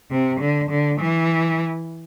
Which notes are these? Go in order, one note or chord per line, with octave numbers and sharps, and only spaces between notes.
C3
D3
D3
E3